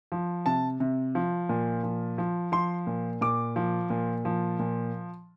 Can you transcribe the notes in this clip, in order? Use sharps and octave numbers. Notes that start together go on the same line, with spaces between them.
F3
C3 A5
C3
F3
A#2
F3
F3
F3 C6
A#2
A#2 D6
F3
A#2
F3
A#2